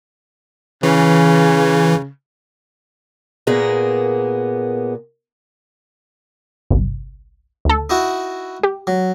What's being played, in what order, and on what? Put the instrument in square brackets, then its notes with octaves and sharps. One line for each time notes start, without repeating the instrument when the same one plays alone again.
[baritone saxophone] C#3 [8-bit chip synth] E3
[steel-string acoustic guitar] A#2 A#3 B3 G#4
[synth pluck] G1 C2
D2 A4
[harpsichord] D#4 E4 F#4
[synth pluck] G4
[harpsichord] F#3